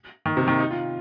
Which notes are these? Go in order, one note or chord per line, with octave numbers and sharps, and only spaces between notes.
D#3
C3
D#3
D#4
F4